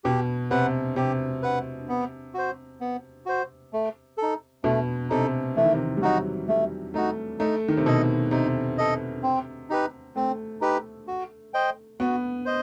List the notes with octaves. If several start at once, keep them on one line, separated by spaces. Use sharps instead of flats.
B2 G4
C3 B4 F#5
C3 G4
B4 F#5
B3
F#4 C5
B3
F#4 C5
A3
D#4 A4
B2 A3
C3 D#4 A4
E3 A3
D#3
C3
D#3
G3
F#3 D#4 F#4
G3 A3
A3 D#4 F#4
A3 D#4
D#3
C3
B2 A4 D#5
C3 D#4
A4 D#5
C4
D#4 G4 B4
A3 C4
D#4 G4 B4
F#4
C5 D#5 G5
B3 F#4
C5 D#5